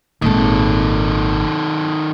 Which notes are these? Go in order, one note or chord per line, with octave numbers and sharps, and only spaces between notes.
G#1 A#2 D#3 A4